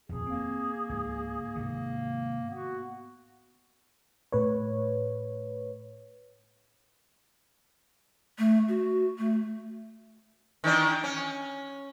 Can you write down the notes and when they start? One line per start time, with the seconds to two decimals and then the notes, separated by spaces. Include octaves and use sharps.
0.09 D#1 F2 G#4
0.26 A#3 C4
0.89 C#2 G#2
1.56 G#2 C3 D#3
2.50 B3 F#4
4.32 A2 B4 C#5
8.38 A3
8.69 F#4
9.18 A3
10.64 D#3 E3 D4
11.04 C#4